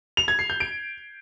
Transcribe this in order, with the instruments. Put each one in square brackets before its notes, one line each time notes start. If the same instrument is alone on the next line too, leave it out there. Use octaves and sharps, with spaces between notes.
[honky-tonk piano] F7
G#6
C7
G6
D7